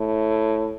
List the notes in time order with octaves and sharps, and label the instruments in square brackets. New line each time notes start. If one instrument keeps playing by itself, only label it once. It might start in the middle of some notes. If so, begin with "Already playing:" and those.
Already playing: [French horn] A2